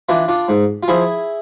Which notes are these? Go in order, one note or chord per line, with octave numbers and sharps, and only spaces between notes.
E3 D4 F4
D4 F4
G#2
F4
F3 E4 G#4